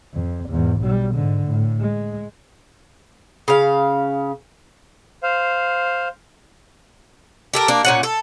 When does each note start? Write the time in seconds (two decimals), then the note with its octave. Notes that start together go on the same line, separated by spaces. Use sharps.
0.13 F2
0.49 E2 G#2
0.81 B1 G3
1.14 G#2 D3
1.48 A2
1.80 G#3
3.48 C#3 F5
5.23 C5 F5
7.53 G4 A4 A#4
7.68 A#3 D4
7.85 A#2 C#4 F#5
8.03 A4